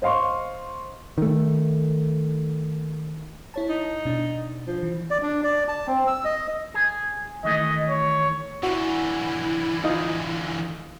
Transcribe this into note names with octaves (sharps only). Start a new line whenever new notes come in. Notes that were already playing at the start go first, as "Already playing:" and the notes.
C5 D#5 F5 C6 C#6
D#3 A3
E4 C#5 A5
D#4
B2 D4
F3
E3
D5
D4
D5
A5
C4
E6
D#5
G#4
D#3 E3 A3 D#5
C#5
D3 E3 E4 F#4
D#4 F4 D#5